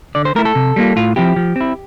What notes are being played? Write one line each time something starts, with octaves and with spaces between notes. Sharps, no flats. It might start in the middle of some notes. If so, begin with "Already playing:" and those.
D3 D5
C5
A3 E4 A#4
A4
C3
G3 A#3 F4
A2 F4
F3 C4 E4 G4
F3
C4 E4